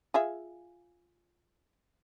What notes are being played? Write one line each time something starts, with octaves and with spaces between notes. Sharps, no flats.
F4 G#4 E5